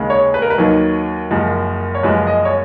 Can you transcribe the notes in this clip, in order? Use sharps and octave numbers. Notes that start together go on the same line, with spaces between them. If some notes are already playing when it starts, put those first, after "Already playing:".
Already playing: D#2 C#3 G#3
C#5
B4
A#4
B4
D#2 D#3 F#3
F#1 F#2 F3 G#3
C#5
F#1 F#2 F3 G#3 B4
D#5
C#5